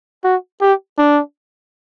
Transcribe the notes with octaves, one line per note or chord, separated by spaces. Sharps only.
F#4
G4
D4